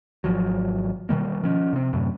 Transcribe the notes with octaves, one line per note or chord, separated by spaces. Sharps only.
G#1 F3 F#3
B2 D#3 G3 A#3
F3 C#4
C3 C4
F#2 A2 C3